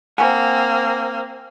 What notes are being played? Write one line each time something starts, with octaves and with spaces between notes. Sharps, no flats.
A#3 C4 F#5 G#5